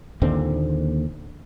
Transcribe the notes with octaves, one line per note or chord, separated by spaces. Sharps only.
D#2 A#2 D3 C4